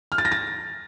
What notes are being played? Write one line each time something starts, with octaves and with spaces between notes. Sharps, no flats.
F6
A6
A#6
A6